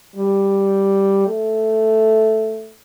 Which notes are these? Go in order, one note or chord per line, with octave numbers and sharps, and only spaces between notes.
G3
A3